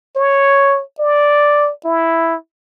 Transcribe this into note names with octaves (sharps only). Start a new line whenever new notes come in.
C#5
D5
E4